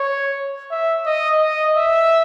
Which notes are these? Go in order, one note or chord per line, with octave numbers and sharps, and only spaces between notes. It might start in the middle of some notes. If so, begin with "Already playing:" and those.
Already playing: C#5
E5
D#5
D#5
E5